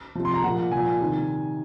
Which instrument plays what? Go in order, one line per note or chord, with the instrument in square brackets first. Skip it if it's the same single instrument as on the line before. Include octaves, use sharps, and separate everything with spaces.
[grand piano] C3 F3
C6
A#5
A#2 F3 F#5
A#2 F3 G#5
C3 D#3